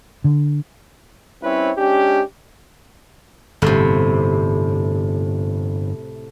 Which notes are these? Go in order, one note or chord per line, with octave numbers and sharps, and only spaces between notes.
D3
G3 C4 C#4 E4 B4 C#5
G#3 C#4 D4 G4
G1 A2 C3